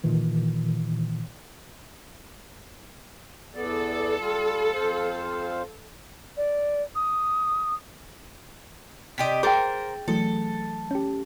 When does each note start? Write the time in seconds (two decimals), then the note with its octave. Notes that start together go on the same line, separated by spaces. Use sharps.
0.04 A#2 D#3 E3
3.55 E2 B3 A4 D5
4.20 G3 F4
4.73 F2 C5 F5
6.37 D5
6.95 D#6
9.18 C3 G4 D#5 B6
9.43 G#4 A#4 C5 G5 G6 A6
10.08 E3 F#3 A3 A4
10.91 C#4 G4